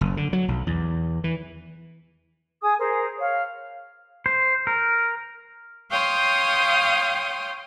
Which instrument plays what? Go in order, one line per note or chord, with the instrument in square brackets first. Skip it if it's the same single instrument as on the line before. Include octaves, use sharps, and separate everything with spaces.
[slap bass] F#1
D3
F#3
B1
E2
E3
[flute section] G#4 G#5 D#6
G#4 A#4 C5
C#5 F5
[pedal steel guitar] C5
A#4
[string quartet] C#5 F5 G5 C6 D#6